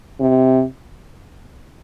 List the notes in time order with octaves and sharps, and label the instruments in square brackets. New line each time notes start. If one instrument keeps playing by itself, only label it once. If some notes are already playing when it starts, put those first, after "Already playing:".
[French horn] C3